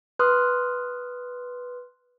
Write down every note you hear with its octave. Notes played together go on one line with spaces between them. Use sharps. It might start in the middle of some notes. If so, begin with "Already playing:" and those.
B4 C6 D#6 F6 F#6